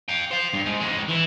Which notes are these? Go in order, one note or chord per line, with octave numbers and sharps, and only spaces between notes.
F5 G5
C5 F5
G2
G#2
F2 G#3
E3 E4